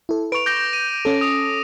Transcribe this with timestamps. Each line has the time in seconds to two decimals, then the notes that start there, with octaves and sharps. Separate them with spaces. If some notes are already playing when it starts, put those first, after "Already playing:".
0.09 E4 A4
0.32 B4 C#6 D7 F7
0.46 D6 G6 A#6
0.73 D#7
1.05 C#4 A4
1.21 D#6